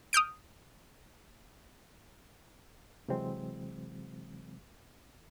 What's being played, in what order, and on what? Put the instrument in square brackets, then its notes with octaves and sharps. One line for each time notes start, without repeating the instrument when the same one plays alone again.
[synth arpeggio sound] D#6 F6 G6 D7
[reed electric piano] C3 E3 F#3 G#3 C4